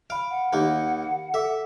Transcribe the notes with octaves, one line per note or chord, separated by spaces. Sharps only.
F5 B5 D7
F#5
D#2 A#3
A4 E5 D6